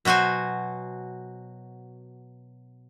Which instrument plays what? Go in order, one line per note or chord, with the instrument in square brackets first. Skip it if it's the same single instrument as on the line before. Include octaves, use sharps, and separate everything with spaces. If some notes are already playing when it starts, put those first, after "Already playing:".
[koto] B2 F#3 F#4 C5 G#5